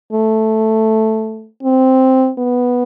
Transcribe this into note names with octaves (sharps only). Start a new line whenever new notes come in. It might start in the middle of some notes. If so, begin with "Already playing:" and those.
A3
C4
B3